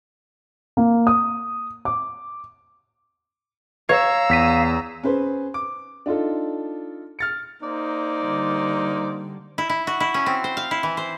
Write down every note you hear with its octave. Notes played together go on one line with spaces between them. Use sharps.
A#3
D#6
D6
C#5 F5 A#5 E6
E2 B6 D#7
C#4 G#4 B4 C5
D6
D4 D#4 F4 A4
F6 A6 C#7
A#3 D#4 C5 D5
D3 G3
E4
E4
F#4
E4
C#4
C4
C5
F5
E4
E3
C5